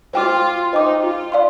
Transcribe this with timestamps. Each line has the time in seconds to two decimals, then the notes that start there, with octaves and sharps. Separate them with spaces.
0.13 F4 C5 G5 D6
0.73 D#4 C5 D#5 G5 D6
1.02 F4
1.32 D5 F5 C6